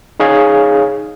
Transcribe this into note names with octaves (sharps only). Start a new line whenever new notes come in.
D#4 G#4 C#5 F5